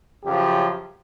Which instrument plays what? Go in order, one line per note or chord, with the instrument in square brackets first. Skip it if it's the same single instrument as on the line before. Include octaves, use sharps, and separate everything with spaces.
[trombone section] F#2 C#3 F3 G4